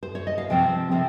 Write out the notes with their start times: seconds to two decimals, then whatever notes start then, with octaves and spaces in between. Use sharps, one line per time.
0.03 C5
0.15 C#5
0.27 D#5
0.38 F5
0.50 C3 F3 C4 G5
0.91 C3 F3 C4